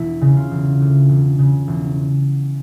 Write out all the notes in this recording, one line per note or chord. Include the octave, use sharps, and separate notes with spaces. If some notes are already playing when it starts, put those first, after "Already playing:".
Already playing: E1 E4
C#3
F4
E1
D2
E1
C#3
E1